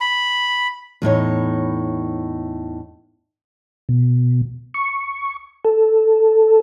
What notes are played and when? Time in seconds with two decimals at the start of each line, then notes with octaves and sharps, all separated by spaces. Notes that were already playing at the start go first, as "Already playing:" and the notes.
0.01 B5
1.02 E2 A2 D#4 C#5
3.89 B2
4.74 C#6
5.65 A4